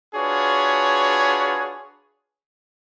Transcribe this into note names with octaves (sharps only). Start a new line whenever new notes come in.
D4 F4 F#4 G#4 B4 C#5